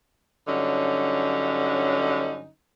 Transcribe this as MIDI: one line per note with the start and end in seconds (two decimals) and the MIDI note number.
0.47 2.48 43
0.47 2.48 50
0.47 2.48 54
0.47 2.48 61
0.47 2.48 63